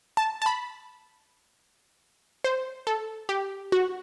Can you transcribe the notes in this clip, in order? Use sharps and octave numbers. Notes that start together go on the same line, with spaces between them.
A5
A5
B5
C5
A4
G4
F#4